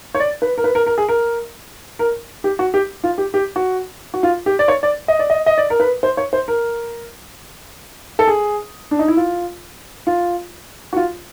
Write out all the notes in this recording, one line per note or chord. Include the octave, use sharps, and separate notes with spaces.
C#5
D5
B4
A#4
B4
A#4
A#4
G#4
A#4
A#4
G4
F#4
G4
F4
G4
G4
F#4
F#4
F4
G4
D5
C#5
D5
D#5
D5
D#5
D#5
D5
A#4
B4
C5
C#5
C5
A#4
A4
G#4
D4
D#4
E4
F4
F4
F#4
F4